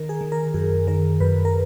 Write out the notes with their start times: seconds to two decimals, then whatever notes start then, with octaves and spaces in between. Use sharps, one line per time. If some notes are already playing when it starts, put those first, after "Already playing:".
Already playing: D#3 A#4
0.09 G#4
0.21 D#3
0.32 A#4
0.54 F#2 G#4
0.87 D#3 A#4
1.20 F#2 B4
1.45 A#4